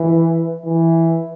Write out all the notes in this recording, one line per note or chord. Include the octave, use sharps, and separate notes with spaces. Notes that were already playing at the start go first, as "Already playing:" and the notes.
Already playing: E3
E3